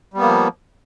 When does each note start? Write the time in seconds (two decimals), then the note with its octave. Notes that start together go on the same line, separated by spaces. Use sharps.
0.14 G3
0.18 B3
0.21 A#3
0.25 F3